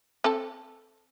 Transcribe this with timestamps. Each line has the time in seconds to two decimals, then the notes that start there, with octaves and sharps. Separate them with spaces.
0.24 C4 A4 A5